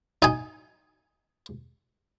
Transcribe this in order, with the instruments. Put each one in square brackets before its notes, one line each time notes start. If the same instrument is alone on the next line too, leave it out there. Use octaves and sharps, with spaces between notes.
[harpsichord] D#4 G#5